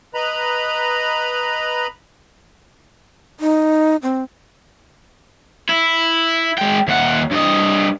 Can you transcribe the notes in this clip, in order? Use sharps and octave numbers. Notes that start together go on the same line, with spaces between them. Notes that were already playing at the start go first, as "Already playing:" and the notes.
B4 D#5 A#5 B5
D#4
C4
E4
G#3 G5
D#2 F#5
G2 D#5